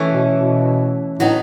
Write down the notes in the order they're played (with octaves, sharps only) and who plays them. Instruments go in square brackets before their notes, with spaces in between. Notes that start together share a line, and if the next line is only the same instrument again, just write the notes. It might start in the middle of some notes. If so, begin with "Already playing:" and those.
Already playing: [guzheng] E3 A3 C#4
[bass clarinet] B2
B2
[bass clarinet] A2 [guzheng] F#3 B3 D#4